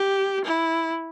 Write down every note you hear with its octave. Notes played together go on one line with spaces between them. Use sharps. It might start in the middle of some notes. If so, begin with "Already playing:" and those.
Already playing: G4
E4